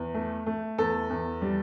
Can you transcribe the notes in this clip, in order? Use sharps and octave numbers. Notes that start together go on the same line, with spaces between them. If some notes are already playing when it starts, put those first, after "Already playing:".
Already playing: E2
A3
A3
E2 A4
E2
G3